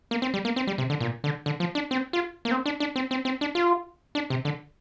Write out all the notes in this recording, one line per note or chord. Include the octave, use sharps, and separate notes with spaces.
A#3
C4
G3
A#3
C4
G3
C3
D3
A#2
D3
D3
F3
D4
C4
F4
A#3
C4
D4
D4
C4
C4
C4
D4
F4
D4
C3
D3